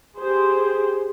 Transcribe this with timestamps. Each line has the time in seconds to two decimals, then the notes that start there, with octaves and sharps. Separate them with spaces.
0.18 G4 G#4 C5